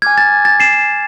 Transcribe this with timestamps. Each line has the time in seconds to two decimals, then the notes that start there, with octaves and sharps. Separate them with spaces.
0.02 G#5 D6 F6 G#6
0.18 A6
0.45 A6
0.60 C7 E7